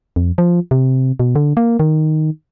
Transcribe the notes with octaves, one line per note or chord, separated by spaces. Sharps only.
F2
F3
C3
B2
D3
A#3
D#3